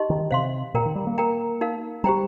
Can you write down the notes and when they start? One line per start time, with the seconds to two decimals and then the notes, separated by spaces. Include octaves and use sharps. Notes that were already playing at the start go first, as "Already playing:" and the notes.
Already playing: D#4 G4 D#5 C6
0.10 D#3
0.31 C3 C5 F5 C6
0.74 A#2 A#4 G5 A#5
0.85 D#3
0.95 G3
1.07 A#3
1.18 A#4 G5 A#5
1.61 D#4 A#4 F5
2.04 G3 G4 C5 G5 A#5